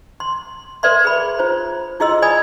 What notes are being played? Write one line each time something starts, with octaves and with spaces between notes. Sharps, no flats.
C6
A#4 B4 D5 E5 C6
G#4 B5
F4 C5
E4 F4 G#4 D#5 C6 E6
D5 D#5 G#5 B5 D#6